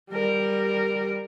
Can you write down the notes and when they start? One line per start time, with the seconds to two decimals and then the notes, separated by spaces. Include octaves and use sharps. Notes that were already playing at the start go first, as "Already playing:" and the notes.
0.10 G3 A#4